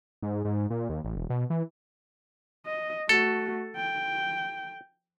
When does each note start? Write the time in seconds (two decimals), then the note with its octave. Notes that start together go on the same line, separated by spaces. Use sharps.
0.23 G#2
0.45 G#2
0.70 A#2
0.89 D#2
1.04 A1
1.16 E1
1.30 B2
1.50 E3
2.66 D#5
3.09 A3 F#4 A4
3.77 G5